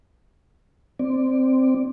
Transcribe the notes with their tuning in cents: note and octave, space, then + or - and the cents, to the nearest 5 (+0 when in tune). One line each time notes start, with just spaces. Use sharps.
C4 -5 D5 +5